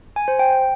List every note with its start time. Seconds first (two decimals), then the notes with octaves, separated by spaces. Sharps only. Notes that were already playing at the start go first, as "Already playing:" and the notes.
0.16 G#5
0.28 C5
0.39 G5